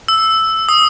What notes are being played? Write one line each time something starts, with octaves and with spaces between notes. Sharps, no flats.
E6
D#6